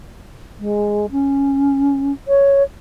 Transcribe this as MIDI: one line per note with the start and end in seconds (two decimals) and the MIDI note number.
0.59 1.06 56
1.11 2.12 61
2.27 2.62 73